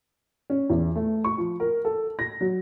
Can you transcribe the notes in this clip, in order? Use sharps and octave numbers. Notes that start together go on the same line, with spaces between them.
C#4
E2
A3
C#6
F3
A#4
A4
A#6
F#3